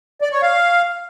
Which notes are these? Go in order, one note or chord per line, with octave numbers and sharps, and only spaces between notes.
D5
C#5
F5